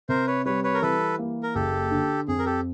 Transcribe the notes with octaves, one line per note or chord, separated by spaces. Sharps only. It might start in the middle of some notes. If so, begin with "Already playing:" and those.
C3 A#4 C5
B4 C#5
G3 B4 C#5
B4 C#5
A#4
E3 A4 B4
A#3
A#4
F#1 G4 A4
D3
F2 G#4
A#4
G4 A4